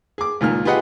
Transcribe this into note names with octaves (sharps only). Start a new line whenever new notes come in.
G#4 D6
C#2 A#2 D#3 F6
F4 G4 G#4 B4 D#5 F#5